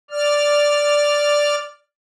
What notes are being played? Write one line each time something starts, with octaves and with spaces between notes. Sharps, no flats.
D5 F6